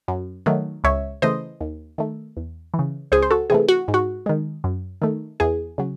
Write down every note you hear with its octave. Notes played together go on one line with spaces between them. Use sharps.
F#2
D#3 F#3 A3
C#2 C#5 E5
C#3 E3 A3 C5 D#5
D#2
D#3 A3
E2
E3
C#3
C#2 G#4 C5
C5
F#4 A4
C3 E3 A3 G#4
F#4
G#2
F#4
D#3 G#3
F#2
D#3 A3
E2 G#4
C#3 F#3